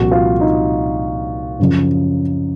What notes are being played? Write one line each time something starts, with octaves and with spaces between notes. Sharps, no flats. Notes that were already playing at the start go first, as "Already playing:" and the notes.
Already playing: C2 A#2 F3 F#4
F4
D#4
F#2 C#3 F3